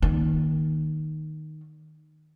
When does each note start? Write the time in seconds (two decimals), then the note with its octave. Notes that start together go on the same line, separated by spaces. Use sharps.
0.02 D#3 A#3